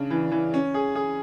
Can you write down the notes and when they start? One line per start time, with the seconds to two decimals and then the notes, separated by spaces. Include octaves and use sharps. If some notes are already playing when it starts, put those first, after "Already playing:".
Already playing: C#3 D4
0.10 E3
0.31 E3
0.54 C#4
0.74 G#4
0.95 G#4